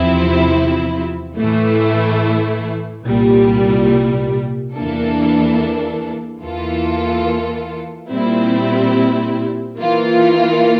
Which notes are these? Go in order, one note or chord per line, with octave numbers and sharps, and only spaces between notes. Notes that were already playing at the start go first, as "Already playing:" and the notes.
Already playing: E2 C3 F3 C4 E4
A2 E3 A3 E4
C2 A#2 G3
E2 E3 A#3 D4 A4
E2 E3 A#3 F4 A4
A#2 G3 C4 E4
E3 A#3 F4